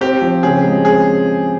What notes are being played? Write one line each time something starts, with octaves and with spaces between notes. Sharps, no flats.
C4 G4
F3
C#3 G#4
G#3
C4 G#4